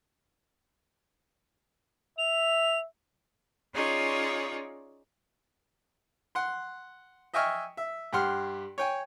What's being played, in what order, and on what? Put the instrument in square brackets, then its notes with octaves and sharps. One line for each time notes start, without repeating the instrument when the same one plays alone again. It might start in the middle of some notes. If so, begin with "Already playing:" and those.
[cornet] E5 [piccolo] F7
[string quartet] C#4 D#4 F4 G#4 C#5 D5
[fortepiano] F#5 C6
D#5 E5 G5 G#5 C#6 F6
E5
G2 G4 F#5 C6 F6
C#5 G5 G#5